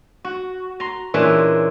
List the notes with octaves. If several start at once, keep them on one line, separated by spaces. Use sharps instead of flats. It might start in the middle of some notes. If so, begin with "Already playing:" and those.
F#4
A#5 C6
A#2 E3 G#3 C#4 D4 E5